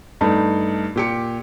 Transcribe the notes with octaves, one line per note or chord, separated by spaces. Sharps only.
G2 A3 D#4
A#2 G4 C#7